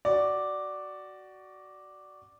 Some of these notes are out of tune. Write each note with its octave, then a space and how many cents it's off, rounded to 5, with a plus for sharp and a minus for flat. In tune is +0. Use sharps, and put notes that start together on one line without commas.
F#4 +15 D5 +0